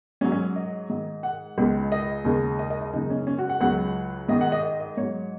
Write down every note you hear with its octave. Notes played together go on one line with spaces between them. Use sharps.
G#2 F#3 C#4
C#4
D#5
G#2 D#3 G#3
F#5
C#2 C#3 G#3
D#5
D#2 C#3 G#3
D#5
D#5
D#5
F#2 C#3 G#3 D#4
C#4
C#4
F#4
F#5
C#2 C#3 F#3 F#5
G#2 D#3 G#3 D#5
F#5
D#5
D#5
D#5
G#2 F#3 C#5